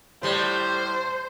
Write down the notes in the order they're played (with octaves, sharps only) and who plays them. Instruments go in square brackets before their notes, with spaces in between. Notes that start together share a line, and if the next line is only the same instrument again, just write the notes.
[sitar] A2 G3 [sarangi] C5